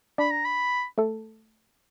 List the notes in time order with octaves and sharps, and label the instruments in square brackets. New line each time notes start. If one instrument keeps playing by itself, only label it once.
[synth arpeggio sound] D4 D5 [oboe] B5
[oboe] A#5
B5
[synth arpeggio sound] A3 A4